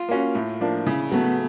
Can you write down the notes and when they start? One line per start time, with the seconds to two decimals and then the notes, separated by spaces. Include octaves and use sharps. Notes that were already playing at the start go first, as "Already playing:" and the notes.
Already playing: F4
0.09 A#3 C#4 F#4
0.35 A2
0.60 F3 A#3 D4
0.87 C#3 E4
1.12 F#3 A3 B3